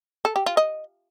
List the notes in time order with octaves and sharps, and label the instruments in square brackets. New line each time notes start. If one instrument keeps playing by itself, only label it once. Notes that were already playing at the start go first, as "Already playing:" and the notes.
[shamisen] A4
G4
F4
D#5